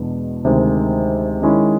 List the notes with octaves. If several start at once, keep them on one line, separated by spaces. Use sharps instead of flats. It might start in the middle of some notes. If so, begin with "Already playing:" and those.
Already playing: E2 B2 G#3 B3 D4
D2 C3 D#3 G#3
D#3 G#3 C#4 E4